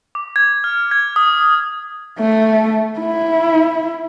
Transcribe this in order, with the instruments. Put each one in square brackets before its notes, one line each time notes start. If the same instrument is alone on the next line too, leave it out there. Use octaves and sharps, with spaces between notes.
[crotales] D6
G#6
F6
G#6
D#6
[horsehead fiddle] A3
E4